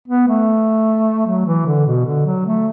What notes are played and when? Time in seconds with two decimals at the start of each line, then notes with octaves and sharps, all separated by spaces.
0.08 B3
0.28 A3
1.26 F#3
1.46 E3
1.66 D3
1.87 B2
2.06 D3
2.26 F#3
2.46 A3